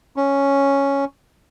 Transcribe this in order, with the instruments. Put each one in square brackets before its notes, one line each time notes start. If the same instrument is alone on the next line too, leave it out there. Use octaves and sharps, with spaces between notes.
[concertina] C#4